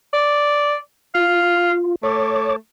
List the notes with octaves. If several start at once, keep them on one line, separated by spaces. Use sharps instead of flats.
D5
F4 F5
A3 C#5 D6